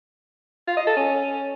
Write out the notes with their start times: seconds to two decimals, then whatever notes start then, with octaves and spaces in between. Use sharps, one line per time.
0.67 F4
0.77 D#5
0.87 A4
0.97 C#4